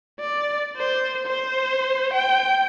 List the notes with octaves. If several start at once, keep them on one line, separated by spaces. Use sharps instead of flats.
D5
C5
C5
G5